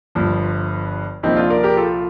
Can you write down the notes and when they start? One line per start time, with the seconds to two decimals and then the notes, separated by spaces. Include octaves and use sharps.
0.15 G1 G2 F3
1.23 C2 A#2 F3 C4 D#4
1.37 D4 F4
1.50 A#4 D5
1.63 G4 A#4
1.76 F4 A4